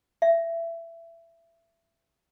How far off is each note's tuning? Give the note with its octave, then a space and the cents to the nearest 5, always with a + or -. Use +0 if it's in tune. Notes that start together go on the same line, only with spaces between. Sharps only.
E5 +20